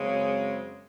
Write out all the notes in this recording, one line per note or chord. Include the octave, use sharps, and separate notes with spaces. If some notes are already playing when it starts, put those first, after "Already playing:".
Already playing: F#2 C#3 G#3 C4